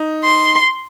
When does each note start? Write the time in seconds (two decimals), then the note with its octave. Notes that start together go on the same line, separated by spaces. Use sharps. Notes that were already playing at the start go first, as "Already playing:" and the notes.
Already playing: D#4
0.24 C6